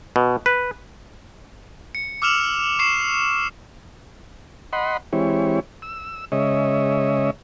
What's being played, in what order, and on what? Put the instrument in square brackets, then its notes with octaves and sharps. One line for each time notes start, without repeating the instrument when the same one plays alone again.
[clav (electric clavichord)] B2
B4
[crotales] C#7
D6 E6 F6 E7 F7
C#6 C7 E7
[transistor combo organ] D#5 F#5 B5 C6
E3 G#3 C4 E4 G4 C#5
E6
C#3 G#3 C#5 D#5 E5